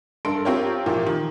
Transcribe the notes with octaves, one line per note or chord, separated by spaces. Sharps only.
G2 A4 A#4 C6 D7
C4 F4 G4 A#4 C#5
A#2 E3 F3 A#3 G4
D#3